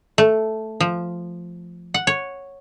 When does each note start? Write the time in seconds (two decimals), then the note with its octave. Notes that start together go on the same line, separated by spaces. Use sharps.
0.18 A3
0.80 F3
1.94 F#5
2.07 C#5